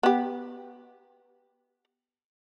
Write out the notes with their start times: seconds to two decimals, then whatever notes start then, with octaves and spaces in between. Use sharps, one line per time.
0.03 B3 G4